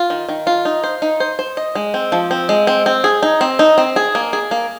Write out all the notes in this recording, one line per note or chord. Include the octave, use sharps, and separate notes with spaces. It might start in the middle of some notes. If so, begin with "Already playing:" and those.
Already playing: F4
D#3
D#3
F4
D#4
C5
D#4
C5
C5
D#5
G#3
C4
F3
C4
G#3
C4
C4
G#4
D#4
C4
D#4
C4
G#4
A#3
G#4
A#3